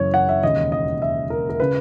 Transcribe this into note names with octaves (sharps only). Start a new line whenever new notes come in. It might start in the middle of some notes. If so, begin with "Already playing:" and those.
Already playing: F#1 F#2 C#3 E3 C#5
F#5
E5
E1 D#2 C#3 D#5
D#5
E5
A#4
A#4
C#3 B4